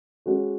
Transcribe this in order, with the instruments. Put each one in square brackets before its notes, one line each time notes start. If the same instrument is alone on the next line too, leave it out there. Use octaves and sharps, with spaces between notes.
[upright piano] G#3 C#4 F#4 A4